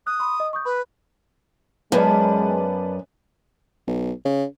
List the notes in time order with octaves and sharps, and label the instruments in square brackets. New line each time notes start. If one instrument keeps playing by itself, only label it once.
[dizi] D#6 [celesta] F#6
[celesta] B5 C6
D#5
C#6 D#6 G6
[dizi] B4 [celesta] B5
[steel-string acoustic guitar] F#2 [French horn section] G#3 [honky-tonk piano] B3 B4 D5 [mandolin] C#4 D4 E4
[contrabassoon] B1
C#3